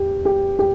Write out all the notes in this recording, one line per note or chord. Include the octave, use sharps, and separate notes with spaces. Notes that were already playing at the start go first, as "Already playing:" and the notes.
Already playing: E2 G4
G4
G4